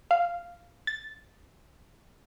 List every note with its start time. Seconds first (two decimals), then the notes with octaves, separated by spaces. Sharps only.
0.11 F5
0.87 A6